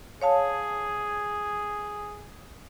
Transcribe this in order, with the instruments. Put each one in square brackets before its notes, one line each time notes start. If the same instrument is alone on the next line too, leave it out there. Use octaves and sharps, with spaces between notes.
[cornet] G#4 [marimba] C#5 F5 A5